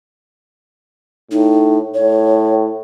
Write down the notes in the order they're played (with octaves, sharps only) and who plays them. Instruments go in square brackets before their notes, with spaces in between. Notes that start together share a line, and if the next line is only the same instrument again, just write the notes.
[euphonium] A2 [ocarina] D#4
[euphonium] A2 [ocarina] C#5